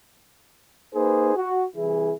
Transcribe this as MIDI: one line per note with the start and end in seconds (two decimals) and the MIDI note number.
0.94 1.34 58
0.94 1.34 63
0.94 1.34 68
0.94 1.34 71
0.94 1.34 72
1.36 1.63 66
1.76 2.13 36
1.76 2.13 52
1.76 2.13 64
1.76 2.13 68